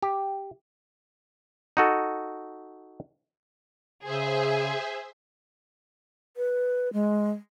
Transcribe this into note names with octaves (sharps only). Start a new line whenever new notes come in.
G4
D#4 F#4 A4
C#3 G#4 C5 E5
B4
G#3